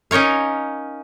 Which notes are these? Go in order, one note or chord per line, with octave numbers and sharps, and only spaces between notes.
C#4 D#4 A#4 C#5 F5